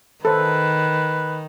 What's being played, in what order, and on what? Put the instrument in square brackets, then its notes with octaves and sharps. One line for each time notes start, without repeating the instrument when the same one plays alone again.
[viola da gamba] D#3 [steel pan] A4 C5 [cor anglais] B4